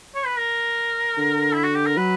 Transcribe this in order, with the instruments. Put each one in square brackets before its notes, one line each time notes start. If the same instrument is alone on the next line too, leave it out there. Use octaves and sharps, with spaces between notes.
[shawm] C#5
B4
A#4
[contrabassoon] D3
[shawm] E4
F#4
G4
A#4
[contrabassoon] F#3 [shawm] B4